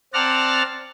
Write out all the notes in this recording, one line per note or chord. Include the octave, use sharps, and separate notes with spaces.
C4 D5 F#5 A5 A#5 F6